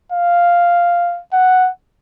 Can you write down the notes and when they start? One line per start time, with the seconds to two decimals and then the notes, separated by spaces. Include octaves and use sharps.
0.12 F5
1.33 F#5